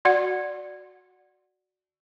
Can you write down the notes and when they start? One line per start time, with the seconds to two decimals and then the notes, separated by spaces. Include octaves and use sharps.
0.05 F#4 D5 F#5